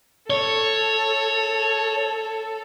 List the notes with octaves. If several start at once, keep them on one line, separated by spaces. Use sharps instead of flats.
A4 C#5